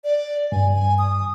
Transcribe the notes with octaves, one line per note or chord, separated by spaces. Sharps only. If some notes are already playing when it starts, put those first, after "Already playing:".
D5
G2 G#5
G#5
D#6